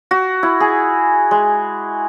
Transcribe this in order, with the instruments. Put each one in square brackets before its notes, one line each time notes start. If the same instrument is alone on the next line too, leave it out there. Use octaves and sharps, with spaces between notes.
[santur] F#4
E4
G#4
G#3